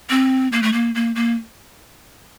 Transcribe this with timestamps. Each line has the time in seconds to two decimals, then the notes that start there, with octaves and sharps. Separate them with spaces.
0.10 C4
0.52 A#3
0.63 A3
0.73 A#3
0.95 A#3
1.16 A#3